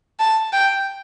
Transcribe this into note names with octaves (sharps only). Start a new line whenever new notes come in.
A5
G5